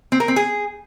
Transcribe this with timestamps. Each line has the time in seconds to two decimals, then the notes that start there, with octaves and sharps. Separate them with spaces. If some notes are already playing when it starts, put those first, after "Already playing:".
0.12 C4
0.20 A#4
0.28 C4
0.36 G#4